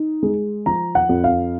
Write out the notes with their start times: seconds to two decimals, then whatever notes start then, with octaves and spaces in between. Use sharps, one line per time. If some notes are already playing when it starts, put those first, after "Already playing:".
Already playing: D#4
0.23 G#3
0.66 F3 A#5
0.95 F#5
1.09 F2
1.24 F5